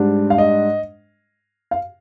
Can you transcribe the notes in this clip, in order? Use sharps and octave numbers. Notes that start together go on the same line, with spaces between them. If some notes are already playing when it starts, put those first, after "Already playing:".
Already playing: G#2 G3 D4
F5
D#5
F5